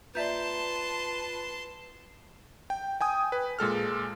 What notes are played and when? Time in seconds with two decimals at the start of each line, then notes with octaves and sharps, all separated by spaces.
0.15 F4 B4 D5 E5 A5 A#5 C6 G6
2.70 G5
3.01 G5 G#5 D#6
3.32 B4
3.59 A#2 G#3 A4 F6